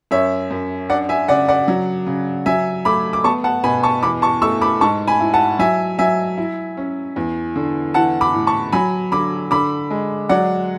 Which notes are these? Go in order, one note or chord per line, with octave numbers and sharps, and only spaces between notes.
F#2 C#5 E5
F#2
D4 D5 F#5
E5 G#5
C#3 D5 F#5
D5 F#5
F#3
C#3
F#3 E5 G#5
A3 B5 D6
D6
B3 A5 C#6
F#5 A5
B2 G#5 B5
A5 C#6
E2 B5 D6
A5 C#6
A3 C#6 E6
B5 D6
G#2 A5 C#6
G#5 B5
E4
F#5 A5
F#3 E5 G#5
F#3 E5 G#5
E4
C#4
E2
D3
E3 F#5 A5
B5 D6
A2
A5 C#6
F#3 G#5 B5
D3 B5 D6
D3 B5 D6
G#3
F#3 D5 F#5